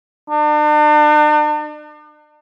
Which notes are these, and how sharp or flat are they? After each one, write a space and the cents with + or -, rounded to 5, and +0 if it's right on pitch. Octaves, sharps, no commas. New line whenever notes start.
D4 +40